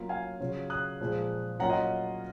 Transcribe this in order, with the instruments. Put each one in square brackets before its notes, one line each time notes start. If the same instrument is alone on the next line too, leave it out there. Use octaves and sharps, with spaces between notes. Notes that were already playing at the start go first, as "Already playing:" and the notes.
Already playing: [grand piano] F#3 A#3 C#4 F4
F5 G#5
C#3 F#3 C#4 F4
D#6 F#6
A#2 F3 G#3
F#3 A#3 C#4 F4 F#5 A#5
D#5 F#5